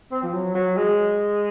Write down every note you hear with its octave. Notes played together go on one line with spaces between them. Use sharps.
C4
F3
F#3
F#3
G#3